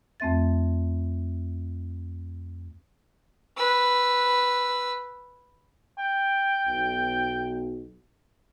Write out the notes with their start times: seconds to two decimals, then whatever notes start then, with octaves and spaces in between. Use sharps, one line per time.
0.20 F2 A3 C4 E5 A6
3.57 B4 E6
5.98 G5
6.66 B1